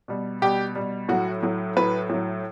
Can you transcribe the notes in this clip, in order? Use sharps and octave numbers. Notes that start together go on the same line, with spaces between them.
B2 G3
B2 G3 G4
B2 G3
A2 F#3 F#4
A2 F#3
A2 F#3 B4
A2 F#3